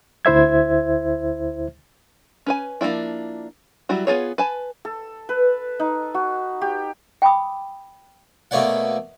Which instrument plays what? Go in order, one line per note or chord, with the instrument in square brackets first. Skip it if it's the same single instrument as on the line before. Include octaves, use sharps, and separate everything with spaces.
[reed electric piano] D2 E4 C5 E5 G#6
[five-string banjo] C#4 B4 G#5
F3 A#3 B3 D4 E4
F#3 G3 E4 F#4
B3 F4 G#4 C#5
B4 G#5 A5
[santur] A4
B4
D#4
F#4
G4
[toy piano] G5 G#5 B5 D6 D#6
[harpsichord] B2 A3 A#3 C#5 D5 F#5